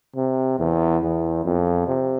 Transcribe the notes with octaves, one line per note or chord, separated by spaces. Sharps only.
C3
E2
E2
F2
C3